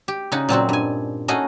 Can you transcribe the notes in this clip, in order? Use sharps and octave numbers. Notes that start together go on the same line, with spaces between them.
G4
C#3 D#4 F#4 F#5
A#2 F#3 C4 F#4
G2 G#5
A3 C#4 D#4 F#4 G#4 D#5